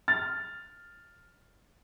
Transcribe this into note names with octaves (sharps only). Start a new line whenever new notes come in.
F6 A6